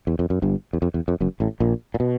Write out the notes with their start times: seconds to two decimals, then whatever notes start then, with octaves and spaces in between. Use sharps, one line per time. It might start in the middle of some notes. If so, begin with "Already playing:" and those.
0.07 E2
0.19 F2
0.30 F#2
0.42 G1 G2
0.73 E2
0.82 F2
0.94 E2
1.08 F2
1.20 F#1 F#2
1.40 A1 A2
1.60 A#1 A#2
1.94 A#2
2.00 B2